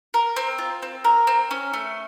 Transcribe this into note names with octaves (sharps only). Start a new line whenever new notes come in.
A#4
C4
F4
C4
A#4
C4
C#4
A3